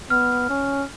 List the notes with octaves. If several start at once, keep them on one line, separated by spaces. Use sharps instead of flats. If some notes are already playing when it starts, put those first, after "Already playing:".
B3 F6
C#4